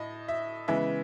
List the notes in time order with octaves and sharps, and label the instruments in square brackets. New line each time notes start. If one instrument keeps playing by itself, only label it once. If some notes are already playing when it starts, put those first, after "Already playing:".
Already playing: [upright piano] A2 D#5
E5
C#3 E3 G#3 B3 E5